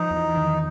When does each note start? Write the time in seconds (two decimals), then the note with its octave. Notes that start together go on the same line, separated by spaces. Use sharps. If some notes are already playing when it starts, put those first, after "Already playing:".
Already playing: F3 D#4
0.11 E2
0.37 D#3